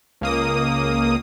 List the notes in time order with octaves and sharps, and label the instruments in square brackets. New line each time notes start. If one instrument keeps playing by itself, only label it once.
[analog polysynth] C#2 A#3 D#6